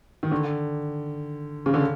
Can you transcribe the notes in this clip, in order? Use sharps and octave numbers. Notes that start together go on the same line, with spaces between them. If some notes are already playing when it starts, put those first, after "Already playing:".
D#3
D3
C#3
D3